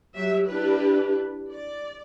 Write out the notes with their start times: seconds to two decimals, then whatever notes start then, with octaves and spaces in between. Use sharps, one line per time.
0.15 F#3 G4 E5
0.46 D4 E4 G4 B4
1.50 D5